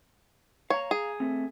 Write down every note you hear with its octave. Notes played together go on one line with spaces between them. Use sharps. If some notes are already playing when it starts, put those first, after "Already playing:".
C#5 F5 A#5
G#4
A3 C4